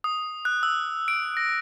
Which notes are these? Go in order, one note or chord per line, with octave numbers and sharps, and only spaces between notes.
D#6
F#6
E6
D7
A#6